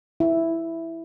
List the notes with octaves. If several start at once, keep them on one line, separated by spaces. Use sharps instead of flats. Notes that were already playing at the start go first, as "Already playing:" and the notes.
E4